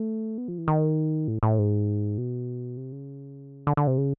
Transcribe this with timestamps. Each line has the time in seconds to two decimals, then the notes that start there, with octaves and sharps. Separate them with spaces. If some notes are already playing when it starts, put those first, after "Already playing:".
Already playing: A3
0.38 B3
0.48 F3
0.58 E3
0.68 D#3
1.28 A2
1.43 A2
1.59 G#2
2.18 B2
2.77 C3
2.92 C#3
3.67 D3
3.77 D3
3.87 C3
3.98 C#3